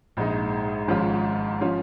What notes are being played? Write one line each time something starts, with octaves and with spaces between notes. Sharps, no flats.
A#1 G#2 G#3 D#4
G#1 G#2 F3 C#4 F4
F3 C#4 F4